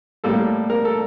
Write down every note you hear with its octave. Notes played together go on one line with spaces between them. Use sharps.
A2 G3 A#3 A4
A#4
A4